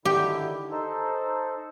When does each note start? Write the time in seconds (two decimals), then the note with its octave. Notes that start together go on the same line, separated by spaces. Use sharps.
0.05 D3 D#3 E4 G4
0.71 D#4 A4 C5